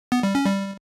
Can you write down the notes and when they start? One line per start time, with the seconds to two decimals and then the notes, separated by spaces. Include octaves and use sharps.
0.12 B3
0.23 G3
0.35 C#4
0.46 G3